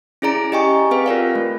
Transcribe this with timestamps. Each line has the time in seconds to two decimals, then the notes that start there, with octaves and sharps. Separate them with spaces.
0.22 C#4 E4 G#4 D5 A#5 D7
0.52 G4 D#5 G5 G#5 C#6
0.91 C4 G#4 B4 F5 G5
1.06 F4 A#4 D5 F5
1.35 A3